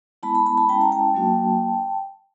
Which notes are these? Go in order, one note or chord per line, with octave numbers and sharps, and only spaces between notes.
G#3 B3 E4 A5 B5
A5 B5
A5 B5
A5 B5
G#3 C#4 E4 G5 A5
A#5
G5 A5
F#3 A#3 D4 F#4